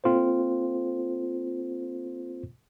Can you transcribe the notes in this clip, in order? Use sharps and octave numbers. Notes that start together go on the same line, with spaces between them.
A#3 C4 F4 A4 C5